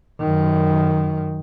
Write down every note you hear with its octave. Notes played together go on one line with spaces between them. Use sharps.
F#2 D#3